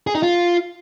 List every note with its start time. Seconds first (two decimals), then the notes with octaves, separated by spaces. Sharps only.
0.07 G#4
0.15 D#4
0.23 F4